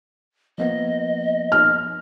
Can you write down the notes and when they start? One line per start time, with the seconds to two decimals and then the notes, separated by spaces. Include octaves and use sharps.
0.58 F3 A#3 B3 D#5
1.52 F6